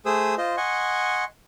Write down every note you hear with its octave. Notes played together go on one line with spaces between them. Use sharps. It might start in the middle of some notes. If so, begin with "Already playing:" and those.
A3 G#4 C5 D#6 E6
F4 C5 D#5
D#5 F#5 G#5 C6 C#6